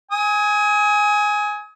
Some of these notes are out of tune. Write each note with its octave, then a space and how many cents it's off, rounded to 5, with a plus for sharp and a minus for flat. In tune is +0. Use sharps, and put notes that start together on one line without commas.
G#5 +0 D#6 +35